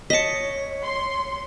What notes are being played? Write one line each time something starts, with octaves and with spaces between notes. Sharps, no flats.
C#5 D#5 A5 B6 C#7
C6